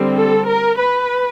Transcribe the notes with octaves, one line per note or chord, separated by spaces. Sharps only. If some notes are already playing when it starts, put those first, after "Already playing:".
Already playing: D3 G3 C4
A4
A#4
B4